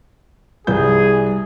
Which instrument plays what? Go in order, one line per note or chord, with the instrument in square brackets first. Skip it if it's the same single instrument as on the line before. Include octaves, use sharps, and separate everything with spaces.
[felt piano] C2 B4 G6 [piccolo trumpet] G#4